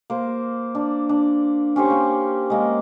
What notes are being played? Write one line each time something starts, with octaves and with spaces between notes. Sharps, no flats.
A#3 C5
D4
D4
C#4 G4 C5 C#6
A#3
G#3 A#3